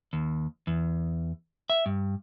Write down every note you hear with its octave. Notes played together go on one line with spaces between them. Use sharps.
D#2
E2
E5
G2